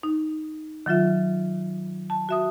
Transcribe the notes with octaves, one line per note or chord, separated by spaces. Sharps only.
D#4
D#3 F#3 F4 E5
A5
F#4 E5 D#6